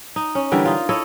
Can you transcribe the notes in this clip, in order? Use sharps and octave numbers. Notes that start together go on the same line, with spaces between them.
D#4
C#4
D3 E3 G3 A#4
D#4 F4
E4 A4 C#5 D#5